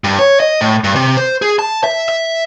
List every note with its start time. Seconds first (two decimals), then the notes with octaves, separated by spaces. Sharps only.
0.04 G2
0.19 C#5
0.40 D#5
0.61 A2
0.84 G2
0.95 C3
1.17 C5
1.42 G#4
1.59 A5
1.84 E5
2.09 E5